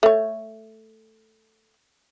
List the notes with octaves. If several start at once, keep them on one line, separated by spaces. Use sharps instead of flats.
A3 C#5